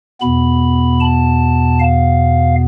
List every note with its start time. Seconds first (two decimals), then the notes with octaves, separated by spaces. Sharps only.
0.20 E2 B2 B3 B5
1.00 A5
1.80 F5